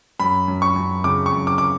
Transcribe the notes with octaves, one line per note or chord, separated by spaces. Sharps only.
F#2 B5
F#2
C#6
F#2
C#3 D6
C#6
F#2
D6
D6